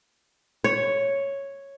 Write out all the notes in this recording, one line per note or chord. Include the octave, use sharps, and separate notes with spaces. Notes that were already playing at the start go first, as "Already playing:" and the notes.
C#5